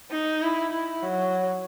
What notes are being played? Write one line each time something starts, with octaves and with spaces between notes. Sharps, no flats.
D#4
E4
E4
F#3